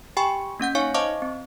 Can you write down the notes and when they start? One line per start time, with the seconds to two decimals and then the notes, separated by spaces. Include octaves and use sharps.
0.17 G4 G5 G#5 B5 C#6
0.60 A#3 C#4 F#5 G6
0.75 D#4 C#5 F5 G#5 C#6
0.94 C5 D#5 F5 A5 C#6 D6
1.22 C4